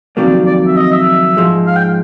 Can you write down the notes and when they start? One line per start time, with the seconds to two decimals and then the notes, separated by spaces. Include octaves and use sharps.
0.17 F2 C3 D#3 F#3 A#3 D5
0.46 D5
0.67 E5
0.77 D#5
0.92 E5
1.37 G#2 F3 G#3
1.67 F5
1.76 G5